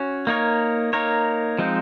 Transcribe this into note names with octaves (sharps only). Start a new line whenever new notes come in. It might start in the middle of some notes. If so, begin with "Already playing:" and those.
Already playing: C#4 F#4 C#5
A#3 D#4 A#4 C#5
A#3 D#4 A#4 C#5
F3 G#3 C4 D#4